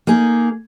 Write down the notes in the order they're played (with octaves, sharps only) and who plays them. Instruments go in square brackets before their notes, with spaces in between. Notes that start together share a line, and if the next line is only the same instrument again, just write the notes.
[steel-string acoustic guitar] A#3 D#4 G#4